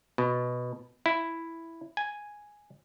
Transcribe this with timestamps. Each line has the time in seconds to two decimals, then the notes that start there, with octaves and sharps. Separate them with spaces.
0.18 B2
1.06 E4
1.97 G#5